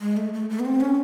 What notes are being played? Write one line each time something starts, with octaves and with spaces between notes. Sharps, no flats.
G#3
A3
A3
A3
B3
C4
C#4